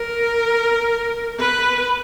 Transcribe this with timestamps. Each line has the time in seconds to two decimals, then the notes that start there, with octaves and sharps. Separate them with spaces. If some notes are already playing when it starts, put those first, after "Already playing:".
Already playing: A#4
1.39 B4